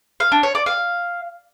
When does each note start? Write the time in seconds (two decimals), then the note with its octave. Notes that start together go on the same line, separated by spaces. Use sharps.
0.20 F5
0.32 D4
0.43 C#5
0.55 D5
0.66 F5